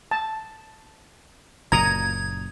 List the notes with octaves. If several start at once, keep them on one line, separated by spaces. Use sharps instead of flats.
A5
F#1 A#2 A#5 D#6 G#6